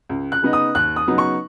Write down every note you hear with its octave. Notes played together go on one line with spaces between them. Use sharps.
C#2
F#6
C#3 B3 D#4
D#6
D#2 F#6
D#6
C#3 F#3 B3 D#4
C#6